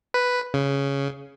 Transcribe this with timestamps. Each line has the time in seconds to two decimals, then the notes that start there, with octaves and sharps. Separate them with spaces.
0.14 B4
0.54 C#3